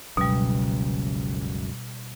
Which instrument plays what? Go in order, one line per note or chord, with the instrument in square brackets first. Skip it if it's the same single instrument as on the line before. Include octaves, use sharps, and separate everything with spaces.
[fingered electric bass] F#1 C#2 F#2 [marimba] B2 G3